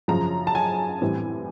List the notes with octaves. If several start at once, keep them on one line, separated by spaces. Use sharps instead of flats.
F#2 C#3 F3 A#5
A5
G#5
A2 E3 G3 C4